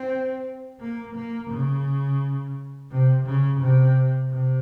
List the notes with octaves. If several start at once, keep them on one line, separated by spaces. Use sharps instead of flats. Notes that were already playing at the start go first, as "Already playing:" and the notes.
Already playing: C4
A#3
A#3
C#3
C3
C#3
C3
C3